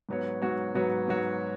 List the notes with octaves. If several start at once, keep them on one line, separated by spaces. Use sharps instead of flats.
G#2 F#3 B3 F#4 C#5
G#2 F#3 B3 F#4 C#5
G#2 F#3 B3 F#4 C#5
G#2 F#3 B3 F#4 C#5